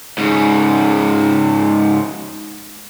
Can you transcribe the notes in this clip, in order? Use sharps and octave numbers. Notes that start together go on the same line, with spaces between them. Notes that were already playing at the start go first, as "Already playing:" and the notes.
G#2 C#3